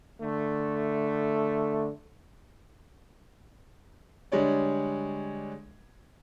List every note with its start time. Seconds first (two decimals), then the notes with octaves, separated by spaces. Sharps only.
0.22 D3 A3
4.32 D3 G3 G#3 C#5 D5